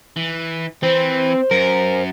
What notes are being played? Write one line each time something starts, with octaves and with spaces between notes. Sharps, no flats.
E3
E3 C4 C5
F#2 A#4